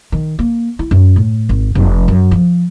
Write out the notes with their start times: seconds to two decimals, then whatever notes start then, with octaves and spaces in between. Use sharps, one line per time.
0.12 D#3
0.39 A#3
0.79 E4
0.91 F#2
1.16 A2
1.49 G#1
1.75 F1
2.08 F#2
2.31 F3